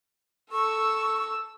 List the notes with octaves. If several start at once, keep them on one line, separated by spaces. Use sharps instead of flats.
A4 C#6 E6